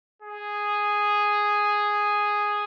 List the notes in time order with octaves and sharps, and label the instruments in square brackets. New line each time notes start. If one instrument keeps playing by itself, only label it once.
[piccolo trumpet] G#4